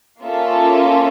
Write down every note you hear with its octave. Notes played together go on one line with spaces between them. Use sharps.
A#3 C#4 F4 A4 E5